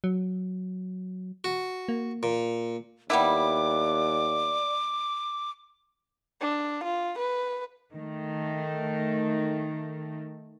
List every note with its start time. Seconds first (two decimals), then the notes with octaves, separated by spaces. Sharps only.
0.04 F#3
1.44 F#4
1.88 A#3
2.23 A#2
3.10 D#2 G3 B3 E4 D5 D6
6.41 D4
6.84 F4
7.19 B4
7.93 D#3 A3